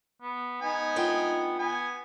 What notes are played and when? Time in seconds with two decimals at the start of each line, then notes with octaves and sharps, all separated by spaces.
0.22 B3
0.62 B3 D#4 G#5
0.96 D2 F4 G5
1.59 B3 G#5